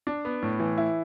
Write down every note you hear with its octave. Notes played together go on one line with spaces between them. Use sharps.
D4
B3
A2
E3
E4